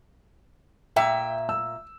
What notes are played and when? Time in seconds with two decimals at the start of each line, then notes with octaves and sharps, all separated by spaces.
0.96 A#2 E5 G5
1.49 E6